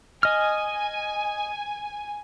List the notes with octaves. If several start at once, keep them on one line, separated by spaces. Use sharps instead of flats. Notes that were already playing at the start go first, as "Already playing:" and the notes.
D#5 G#5 F6